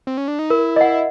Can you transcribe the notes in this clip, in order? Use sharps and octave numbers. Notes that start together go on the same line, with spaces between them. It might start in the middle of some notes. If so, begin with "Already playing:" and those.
C4
C#4
D4
D#4
E4 A#4
D#5 F#5